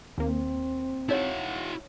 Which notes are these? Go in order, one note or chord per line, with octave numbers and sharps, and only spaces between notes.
D#2 A#3 C4
D#4 E4 F#4 C#5